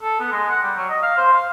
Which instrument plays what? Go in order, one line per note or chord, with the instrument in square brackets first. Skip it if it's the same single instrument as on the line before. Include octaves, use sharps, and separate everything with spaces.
[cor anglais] A4
B3
G#3
F#5
G3
F#3
D#5
F5
C5
F5